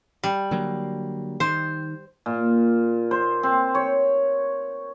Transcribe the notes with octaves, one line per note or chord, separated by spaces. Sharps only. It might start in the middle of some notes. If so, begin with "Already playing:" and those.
G3
D3 F#3 A#3
D#3 C5
A#2
C5
C4
C#5